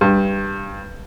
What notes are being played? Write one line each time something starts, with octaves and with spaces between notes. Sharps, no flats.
G2